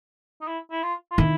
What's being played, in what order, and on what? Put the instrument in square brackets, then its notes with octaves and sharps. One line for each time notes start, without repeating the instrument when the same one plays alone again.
[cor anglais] D#4
E4
E4
F4
F4
[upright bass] D#3 [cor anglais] E4